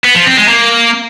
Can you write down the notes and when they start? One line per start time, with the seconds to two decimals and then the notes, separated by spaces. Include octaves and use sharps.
0.05 B3
0.16 F3
0.27 C4
0.38 G#3
0.49 A#3